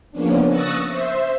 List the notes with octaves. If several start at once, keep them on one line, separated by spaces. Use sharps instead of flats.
C#3 F3 A#3 B3 C#4 D4
C#6 D#6 E6 F#6 A6 A#6
C5 E5